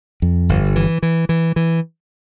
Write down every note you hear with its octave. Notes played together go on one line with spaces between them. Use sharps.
F2
G1
E3
E3
E3
E3